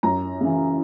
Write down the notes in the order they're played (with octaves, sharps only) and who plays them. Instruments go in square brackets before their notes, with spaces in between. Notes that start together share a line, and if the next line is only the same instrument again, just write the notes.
[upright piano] F#2 A#5
C#3 E3